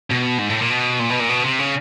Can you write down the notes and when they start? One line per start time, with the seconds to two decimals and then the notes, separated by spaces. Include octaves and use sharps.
0.11 B2
0.39 G#2
0.50 A2
0.60 A#2
0.70 B2
1.00 A#2
1.10 B2
1.20 A#2
1.29 B2
1.44 C3
1.59 C#3